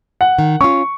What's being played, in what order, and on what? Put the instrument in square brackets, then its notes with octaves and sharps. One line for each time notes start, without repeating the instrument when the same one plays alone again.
[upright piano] F#5
[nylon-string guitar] D#3
[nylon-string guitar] C#4 F4 [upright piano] C#6